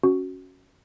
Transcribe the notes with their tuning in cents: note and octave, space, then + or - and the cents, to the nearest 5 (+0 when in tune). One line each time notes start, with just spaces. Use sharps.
C#4 +0 F#4 +0